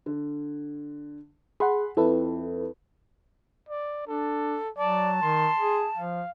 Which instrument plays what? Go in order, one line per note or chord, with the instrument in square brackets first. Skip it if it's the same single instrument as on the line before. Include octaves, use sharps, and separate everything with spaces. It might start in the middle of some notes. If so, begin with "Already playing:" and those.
[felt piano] D3
[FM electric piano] G#4 F#5 [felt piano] B5 C6
[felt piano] F2 [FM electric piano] E4 A4 B4
[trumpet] D5
[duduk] D4 [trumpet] A4
[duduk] F#3 [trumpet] D5 [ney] A5
[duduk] D#3 [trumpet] C6
[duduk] G#4
[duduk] F3 [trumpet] F5